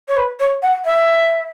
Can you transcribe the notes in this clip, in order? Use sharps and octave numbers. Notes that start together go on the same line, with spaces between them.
C#5
B4
C#5
F#5
E5